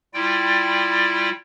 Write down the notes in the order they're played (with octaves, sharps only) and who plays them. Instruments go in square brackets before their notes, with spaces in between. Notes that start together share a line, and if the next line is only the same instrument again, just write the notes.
[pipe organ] G3 E4 F4 D5 G5